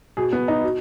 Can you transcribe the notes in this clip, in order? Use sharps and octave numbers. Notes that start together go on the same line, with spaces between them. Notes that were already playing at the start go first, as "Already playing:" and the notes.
B2 G#4
B3
D#4
B2